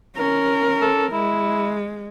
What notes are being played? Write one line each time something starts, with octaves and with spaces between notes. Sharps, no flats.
C#4 A#4
A4
G#3 E4